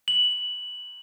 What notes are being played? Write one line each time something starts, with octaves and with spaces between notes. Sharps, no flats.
F#7